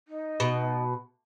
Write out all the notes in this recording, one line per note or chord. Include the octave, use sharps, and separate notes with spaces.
D#4
B2